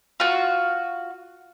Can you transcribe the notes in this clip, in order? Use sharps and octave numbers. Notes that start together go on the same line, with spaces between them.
F4 F#4